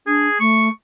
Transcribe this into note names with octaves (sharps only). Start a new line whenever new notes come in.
D4 G#4
A3 C#6